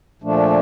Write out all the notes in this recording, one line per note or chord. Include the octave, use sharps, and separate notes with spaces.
A#2 F3 A3 D4